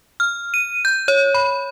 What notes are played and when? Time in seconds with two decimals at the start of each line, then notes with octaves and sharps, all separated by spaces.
0.20 F6
0.54 D#7
0.85 G6
1.08 C#5
1.34 B5